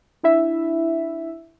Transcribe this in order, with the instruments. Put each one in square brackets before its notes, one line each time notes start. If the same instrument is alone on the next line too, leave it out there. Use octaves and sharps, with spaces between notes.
[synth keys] D4 E4 E5